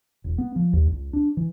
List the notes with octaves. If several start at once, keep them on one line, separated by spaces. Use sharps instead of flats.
E1
B3
F3
D#2
C#2
D4
E3